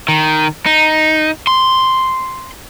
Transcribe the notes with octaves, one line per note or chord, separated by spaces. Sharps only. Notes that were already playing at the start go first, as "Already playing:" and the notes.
D#3
D#4
C6